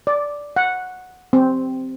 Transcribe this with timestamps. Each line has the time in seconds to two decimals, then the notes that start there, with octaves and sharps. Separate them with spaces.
0.07 D5
0.56 F#5
1.33 C4